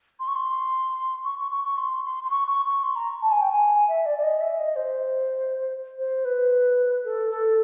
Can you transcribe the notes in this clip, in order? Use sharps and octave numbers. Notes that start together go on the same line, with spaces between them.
C6
C#6
C6
C#6
C#6
C#6
C#6
C6
C6
C6
C#6
C#6
C#6
C6
A#5
A5
G#5
G5
G#5
E5
D5
D5
D#5
E5
D#5
C5
C5
B4
A4
A4